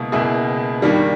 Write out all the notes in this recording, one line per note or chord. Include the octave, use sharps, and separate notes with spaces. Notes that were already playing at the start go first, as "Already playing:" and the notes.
Already playing: C#2 B2 A#3 E4
C#2 B2 A#3 E4 G#4
G2 D#3 G3 A#3